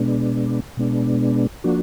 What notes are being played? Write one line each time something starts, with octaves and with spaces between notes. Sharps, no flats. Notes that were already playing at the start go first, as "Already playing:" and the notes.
Already playing: B2 G#3 B3 D4
B2 G#3 B3 D4
F3 A#3 D4 F#4